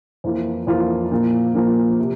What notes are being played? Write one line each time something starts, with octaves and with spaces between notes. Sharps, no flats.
F2 E3 A#3 F4
F2 E3 A#3 F4
A#2 F3 A#3
A#2 F3 A#3
C3